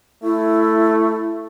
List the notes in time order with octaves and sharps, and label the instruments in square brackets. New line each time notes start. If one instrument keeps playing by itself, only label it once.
[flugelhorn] A3 [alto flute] E4